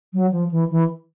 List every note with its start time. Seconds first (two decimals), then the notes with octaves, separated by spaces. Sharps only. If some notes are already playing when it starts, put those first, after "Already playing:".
0.13 F#3
0.31 F3
0.51 E3
0.70 E3